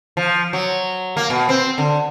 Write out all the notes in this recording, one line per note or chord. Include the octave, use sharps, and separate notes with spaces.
F3
F#3
A#3
B2
C4
D3